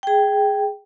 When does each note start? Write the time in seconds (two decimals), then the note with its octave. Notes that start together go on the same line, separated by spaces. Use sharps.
0.03 G#4 G5